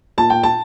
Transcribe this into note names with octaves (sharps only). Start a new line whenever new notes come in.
A#2 A5
G5
A5